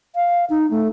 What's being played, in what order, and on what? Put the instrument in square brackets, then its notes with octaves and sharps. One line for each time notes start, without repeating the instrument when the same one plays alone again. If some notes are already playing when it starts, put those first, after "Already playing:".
[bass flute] F5
D#4
A3